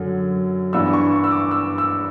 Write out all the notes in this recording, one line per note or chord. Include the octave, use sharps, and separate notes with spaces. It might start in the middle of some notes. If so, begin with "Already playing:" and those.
Already playing: F#2 D3 F#3
G2 E3 B3 D4 E6
C#6
C#6
E6
D6
E6
E6